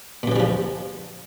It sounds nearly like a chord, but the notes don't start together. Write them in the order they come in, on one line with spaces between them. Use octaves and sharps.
A#2 F#2 E3 G3 F3